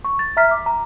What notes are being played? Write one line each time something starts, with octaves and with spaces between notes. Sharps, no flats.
C#6
A6
E5 A#5 F6 B6
D6
A#5